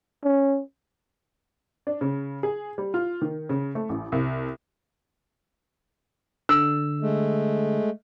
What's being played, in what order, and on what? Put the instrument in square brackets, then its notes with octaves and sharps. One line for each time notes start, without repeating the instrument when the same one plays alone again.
[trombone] C#4
[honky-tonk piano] D4
C#3
G#4
G3
F4
D#3
C#3
A3
A1
C2
[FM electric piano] D3 [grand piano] E6
[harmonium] G#3 A3